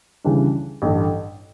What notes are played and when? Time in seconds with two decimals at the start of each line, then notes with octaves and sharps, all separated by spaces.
0.24 C#2 C#3 E3 G3 D4
0.82 A1 G2 D3